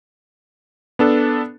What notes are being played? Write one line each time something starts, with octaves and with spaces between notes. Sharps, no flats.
B3 D4 A4